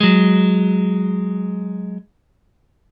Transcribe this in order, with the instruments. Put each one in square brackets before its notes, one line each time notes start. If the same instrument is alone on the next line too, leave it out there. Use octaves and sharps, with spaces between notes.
[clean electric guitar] F#3 G#3